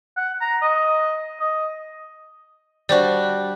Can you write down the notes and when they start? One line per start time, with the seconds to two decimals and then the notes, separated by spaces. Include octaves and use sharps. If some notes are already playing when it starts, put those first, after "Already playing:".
0.17 F#5
0.41 A#5
0.62 D#5
1.40 D#5
2.89 G3 D4 F#4 C5 D5